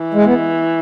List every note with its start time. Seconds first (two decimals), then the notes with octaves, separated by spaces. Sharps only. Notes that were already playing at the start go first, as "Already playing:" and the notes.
Already playing: E3
0.14 G#3
0.25 B3